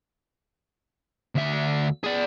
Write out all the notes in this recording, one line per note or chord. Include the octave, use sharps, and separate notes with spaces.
D2 E5
G#4 D5